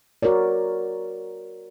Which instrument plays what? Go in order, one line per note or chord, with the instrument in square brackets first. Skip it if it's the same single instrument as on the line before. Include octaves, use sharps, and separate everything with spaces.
[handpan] F#4 A#4 C#5 D5